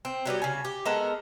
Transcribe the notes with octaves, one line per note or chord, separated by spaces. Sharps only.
C4
F#3 G3 B3 G4
C#3 G#5
G4
G#3 B3 A4 A#4